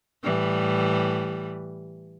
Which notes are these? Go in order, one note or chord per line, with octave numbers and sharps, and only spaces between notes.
A2 E3 G3